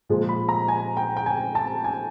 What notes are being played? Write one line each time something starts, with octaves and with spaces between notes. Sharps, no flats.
A#2 F3 G#3
B5
A#5
G#5
G5
G5
G#5
A5
G#5